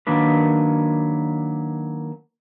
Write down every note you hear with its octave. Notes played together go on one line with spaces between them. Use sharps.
D#3 F#3 A#3 D4 B4